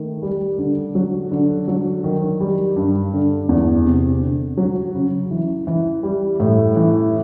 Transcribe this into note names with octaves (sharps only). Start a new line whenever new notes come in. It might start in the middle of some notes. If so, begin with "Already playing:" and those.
Already playing: D#3 A3
G3
D3
F#3
D3
F#3
D#3
G3
G2
D3
E2
C3
D3
F#3
C#3
E3
E3
G3
A2
E3